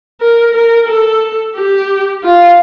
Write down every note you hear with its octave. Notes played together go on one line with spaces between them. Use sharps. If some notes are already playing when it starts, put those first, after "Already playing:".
A#4
A#4
A4
G4
F4